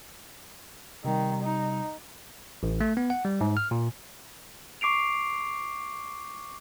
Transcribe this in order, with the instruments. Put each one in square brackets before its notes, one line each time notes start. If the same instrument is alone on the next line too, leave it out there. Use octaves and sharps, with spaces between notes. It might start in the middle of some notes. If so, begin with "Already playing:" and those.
[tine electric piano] C3 G3 [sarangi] D#3
[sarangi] D#4
[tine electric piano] A1
A3
B3
F#5
G3
G#2
F6
A#2
[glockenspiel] C#6 D6 C7 D7 F7